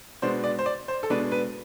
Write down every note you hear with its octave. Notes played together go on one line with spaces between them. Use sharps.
B2 G#3 B3 D4 C5
D5
C5
D5
C5
A4
B2 G#3 B3 D4 B4
B4